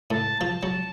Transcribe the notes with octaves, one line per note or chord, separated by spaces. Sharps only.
A2 A5
F3 A5
F#3